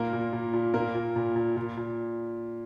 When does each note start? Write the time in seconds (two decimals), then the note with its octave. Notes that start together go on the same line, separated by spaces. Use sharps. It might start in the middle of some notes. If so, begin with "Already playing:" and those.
Already playing: A#2 A#3 A#4
0.13 A#2
0.33 A#2
0.53 A#2
0.74 A#2 A#3 A#4
0.95 A#2
1.16 A#2
1.36 A#2
1.57 A#2
1.77 A#2